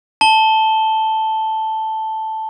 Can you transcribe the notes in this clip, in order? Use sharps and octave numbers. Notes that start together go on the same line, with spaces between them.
A5 G7